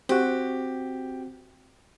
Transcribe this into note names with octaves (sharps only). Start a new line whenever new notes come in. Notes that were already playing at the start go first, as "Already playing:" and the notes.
C4 F#4 G4